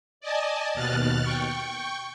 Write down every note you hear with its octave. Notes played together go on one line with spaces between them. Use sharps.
D5 D#5 G#5 A5
D#2 B2 F6 F#6 A6
G5 C#6